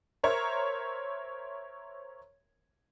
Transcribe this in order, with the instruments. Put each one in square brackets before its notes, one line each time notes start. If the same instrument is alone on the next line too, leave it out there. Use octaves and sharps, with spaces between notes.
[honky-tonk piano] A#4 C5 C#5 E5 A#5